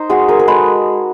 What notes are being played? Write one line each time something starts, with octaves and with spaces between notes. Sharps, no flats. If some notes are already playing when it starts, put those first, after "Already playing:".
Already playing: D#4 C5
G#3 F#4 G#4
G#4 A#4
A#4
G#3 A4 B4